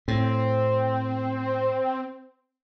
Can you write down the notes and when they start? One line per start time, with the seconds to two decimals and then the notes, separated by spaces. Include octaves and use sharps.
0.08 A2 C4